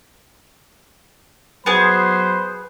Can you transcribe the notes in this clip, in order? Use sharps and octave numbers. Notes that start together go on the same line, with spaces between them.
F#3 B3 G#4 C5 B5